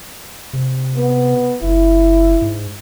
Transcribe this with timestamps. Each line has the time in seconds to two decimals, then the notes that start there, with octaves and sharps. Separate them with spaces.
0.53 C3
0.96 B3
1.61 F#1 E4
2.41 G#2